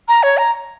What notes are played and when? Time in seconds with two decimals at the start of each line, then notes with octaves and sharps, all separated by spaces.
0.08 A#5
0.23 C#5
0.38 A#5